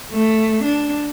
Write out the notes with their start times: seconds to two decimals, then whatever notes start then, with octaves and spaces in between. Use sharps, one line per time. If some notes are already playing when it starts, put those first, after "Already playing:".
0.12 A3
0.63 D4